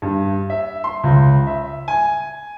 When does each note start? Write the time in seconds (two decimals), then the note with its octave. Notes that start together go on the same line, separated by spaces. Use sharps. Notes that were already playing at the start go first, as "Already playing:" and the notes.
0.02 G2
0.50 E5
0.84 C6
1.03 C#2
1.47 E5
1.88 G#5